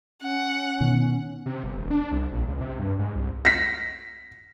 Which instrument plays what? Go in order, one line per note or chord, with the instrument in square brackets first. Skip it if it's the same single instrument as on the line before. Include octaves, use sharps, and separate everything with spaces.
[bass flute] C#4 [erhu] F#5
[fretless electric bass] B2 D#3
[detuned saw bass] C3
G1
E1
D4
C2
A#1
C#2
C3
G2
G#2
C2
[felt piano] A#6 B6